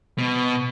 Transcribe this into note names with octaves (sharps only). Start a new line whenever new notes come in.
B2